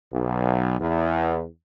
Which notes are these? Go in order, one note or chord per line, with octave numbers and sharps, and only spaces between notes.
B1
E2